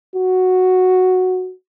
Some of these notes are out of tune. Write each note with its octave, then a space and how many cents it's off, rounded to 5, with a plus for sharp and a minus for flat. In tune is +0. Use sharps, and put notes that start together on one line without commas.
F#4 -5